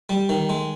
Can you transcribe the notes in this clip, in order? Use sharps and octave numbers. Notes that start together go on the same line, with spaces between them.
G3
D#3
G#3